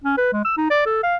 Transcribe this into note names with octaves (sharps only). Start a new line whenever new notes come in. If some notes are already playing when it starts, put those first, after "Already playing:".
C#4
B4
G#3
E6
D#4
D5
A4
F5